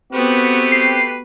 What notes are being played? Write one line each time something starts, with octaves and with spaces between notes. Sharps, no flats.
A3 B3 C4 F#4 G4 B4
C7